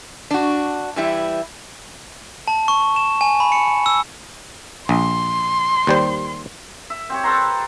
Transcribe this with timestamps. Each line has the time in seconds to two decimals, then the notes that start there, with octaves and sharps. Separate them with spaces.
0.31 D4 F#4
0.96 E3 G3 E4
2.48 A5
2.68 C#6
2.96 E7
3.21 G#5
3.40 B5
3.52 C#7
3.86 E6
4.89 A#1 C6
5.87 D#2 G3 C5
6.90 E5
7.10 C4 G4 C#5
7.24 A4 B4 C5 A#5